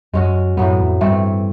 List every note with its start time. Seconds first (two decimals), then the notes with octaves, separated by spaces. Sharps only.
0.14 F#2 G#3 C#4 F#4
0.57 F#2 A2 F#3 B3
0.80 F2
1.01 G2 E3 A3 C4